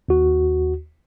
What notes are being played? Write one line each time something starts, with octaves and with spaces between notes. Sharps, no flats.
D#2 F#4